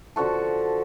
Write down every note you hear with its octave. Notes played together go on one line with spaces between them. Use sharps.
D3 F3 F#4 A4